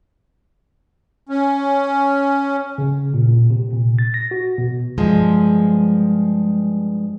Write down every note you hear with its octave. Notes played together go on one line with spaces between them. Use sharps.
C#4
C#3
A#2
A#2
C3
A#2
A6
A#6
F#4
B2
G2 F3 G#3